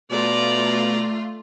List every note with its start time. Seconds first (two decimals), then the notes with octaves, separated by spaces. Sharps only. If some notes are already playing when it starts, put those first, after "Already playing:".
0.11 B2 A3 F4 D5 A#5